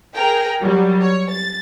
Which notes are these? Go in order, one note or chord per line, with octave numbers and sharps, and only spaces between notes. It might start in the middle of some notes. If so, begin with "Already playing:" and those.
G#4 A#4 G5
F#3 G3
C#5
A6